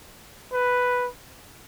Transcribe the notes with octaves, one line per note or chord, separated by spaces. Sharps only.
B4